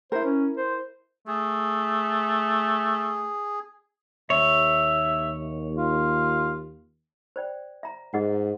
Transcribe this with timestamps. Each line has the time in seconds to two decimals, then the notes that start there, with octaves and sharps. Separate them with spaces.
0.12 E4 A#4 C5
0.25 C#4
0.57 C5
1.27 A3 G#4
4.30 D#2 C#5 E5
5.77 F4
7.36 C5 D5 G5
7.83 E5 A#5
8.14 G#2 G#4 D#5 F#5